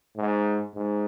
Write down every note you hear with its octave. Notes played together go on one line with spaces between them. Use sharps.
G#2
G#2